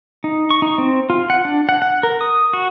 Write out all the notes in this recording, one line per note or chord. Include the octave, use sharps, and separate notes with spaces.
D#4
C#6
D#4
C4
F4
F#5
D4
F#5
F#5
A#4
D#6
F#4